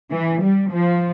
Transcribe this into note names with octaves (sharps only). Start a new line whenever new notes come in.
E3
G3
F3